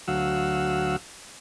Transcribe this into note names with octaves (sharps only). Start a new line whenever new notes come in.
D2 F#3 F#4 F5 F#5 E6